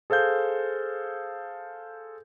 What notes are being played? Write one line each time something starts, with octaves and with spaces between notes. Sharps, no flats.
G#4 A4 C5 F5 G6